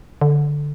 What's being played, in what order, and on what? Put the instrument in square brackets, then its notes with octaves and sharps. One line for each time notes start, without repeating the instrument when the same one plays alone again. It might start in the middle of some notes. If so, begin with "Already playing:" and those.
[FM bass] D3